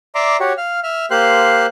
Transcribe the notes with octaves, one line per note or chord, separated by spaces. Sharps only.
D5 E5 A#5 C6 D6
F#4 G4 C#5
F5 F6
E5 F6
A#3 G4 C5 F5 C6 F#6